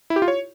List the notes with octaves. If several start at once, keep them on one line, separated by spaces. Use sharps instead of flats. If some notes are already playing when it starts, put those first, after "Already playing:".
E4
G4
F4
C#5